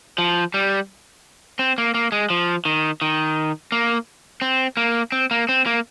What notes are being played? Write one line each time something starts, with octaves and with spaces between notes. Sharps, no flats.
F3
G3
C4
A#3
A#3
G#3
F3
D#3
D#3
A#3
C4
A#3
C4
A#3
C4
A#3